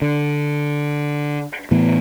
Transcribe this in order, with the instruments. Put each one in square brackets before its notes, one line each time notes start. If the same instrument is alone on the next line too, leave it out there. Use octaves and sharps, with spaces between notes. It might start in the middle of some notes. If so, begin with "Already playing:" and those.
[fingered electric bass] D3
A2 E3 B3